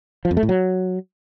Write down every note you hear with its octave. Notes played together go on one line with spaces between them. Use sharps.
F3
F2
A3
A2
F#3